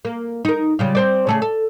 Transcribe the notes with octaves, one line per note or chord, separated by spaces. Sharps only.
A#3
D#4 A#4
C#3 G3 F4
C4 C5 D5
C#3 A3 G#4
A4